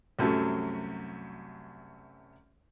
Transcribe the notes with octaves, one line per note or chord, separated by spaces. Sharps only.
C2 F#2 F#3 A3